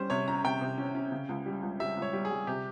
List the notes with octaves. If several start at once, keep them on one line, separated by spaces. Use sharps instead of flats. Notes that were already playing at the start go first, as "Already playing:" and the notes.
Already playing: G3 C#4 C5
C3 C#5
C#4 A#5
C3 G5
C3
C#4
C#4
C#3
C#2
G3
C#2
G3 E5
C#2
C#5
G3
G#4
G3
C3 G4